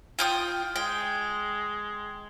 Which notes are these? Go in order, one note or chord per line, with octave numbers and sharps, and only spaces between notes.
F4 G5 D#6
G#3 G5